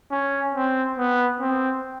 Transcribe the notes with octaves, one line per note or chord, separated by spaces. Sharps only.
C#4
C4
B3
C4